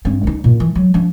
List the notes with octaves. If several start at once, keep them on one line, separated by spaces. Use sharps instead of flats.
G2 C4
D2 D#4
A#2
E3
F#3
F3 D4